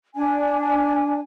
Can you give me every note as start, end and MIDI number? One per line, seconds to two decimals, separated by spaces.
0.15 1.20 62
0.15 1.20 80